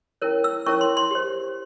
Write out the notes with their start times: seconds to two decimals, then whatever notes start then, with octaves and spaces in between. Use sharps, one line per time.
0.22 C#4 E4 A#4 C#5
0.44 E6
0.66 C#4 E4 A#4 C#5 C#6
0.81 C6
0.97 C6
1.11 G4 C5